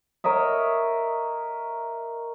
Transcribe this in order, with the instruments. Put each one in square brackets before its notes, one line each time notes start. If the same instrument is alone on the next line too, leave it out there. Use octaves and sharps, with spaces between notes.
[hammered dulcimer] A#4 C#5 D#5 E5